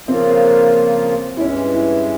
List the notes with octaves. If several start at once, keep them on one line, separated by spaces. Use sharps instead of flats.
C#3 F3 A#3 C4 F4
E4
G2 E3 G#3 C#4
E4